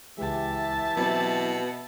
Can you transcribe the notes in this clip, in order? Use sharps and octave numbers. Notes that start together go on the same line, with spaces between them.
C#2 E3 G#3 G4 E5 A5
B2 F#3 C4 E4